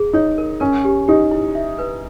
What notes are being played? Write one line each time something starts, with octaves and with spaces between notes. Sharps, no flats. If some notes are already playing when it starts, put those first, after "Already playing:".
Already playing: G#4
D#4 C#5
A#4
C#4 A#4
G4
D#4 G4
E4
E5
B4